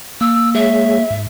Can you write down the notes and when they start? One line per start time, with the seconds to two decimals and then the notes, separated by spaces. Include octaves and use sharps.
0.21 A#3 E6
0.55 G#3 G#4 C#5 E5
1.10 G#2